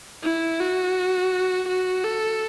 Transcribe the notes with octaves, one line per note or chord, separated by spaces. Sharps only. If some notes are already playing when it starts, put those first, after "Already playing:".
E4
F#4
F#4
A4